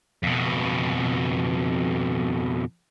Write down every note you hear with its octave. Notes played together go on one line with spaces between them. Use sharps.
F2 B2